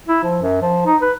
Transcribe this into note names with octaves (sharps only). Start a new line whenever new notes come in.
E4
F3
F#2
F3
D#4
B4